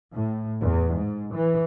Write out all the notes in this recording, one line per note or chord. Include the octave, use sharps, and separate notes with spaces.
A2
E2
G#2
E3